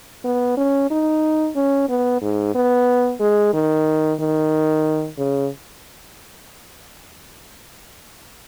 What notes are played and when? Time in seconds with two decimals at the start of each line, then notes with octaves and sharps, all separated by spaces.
0.25 B3
0.57 C#4
0.91 D#4
1.56 C#4
1.89 B3
2.22 G#2
2.55 B3
3.21 G#3
3.54 D#3
4.20 D#3
5.19 C#3